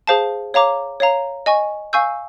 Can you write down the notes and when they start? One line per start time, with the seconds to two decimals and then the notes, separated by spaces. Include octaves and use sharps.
0.07 G#4 C5 F5 A5
0.54 C#5 F5 A#5 D6
1.00 C#5 F5 A#5
1.46 D#5 G#5 C#6
1.93 F5 G#5 C#6 E6 G6